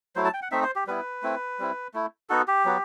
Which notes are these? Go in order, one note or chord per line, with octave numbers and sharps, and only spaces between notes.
F#3 A3 E4 C5
A5
G5
F#5
A3 C4 D#4 E5
C5
G4
G3 B3 E4 B4
A3 C4 E4
G3 C4 E4
A3 E4
B3 D#4 F#4 A4
G4
F#3 B3 F#4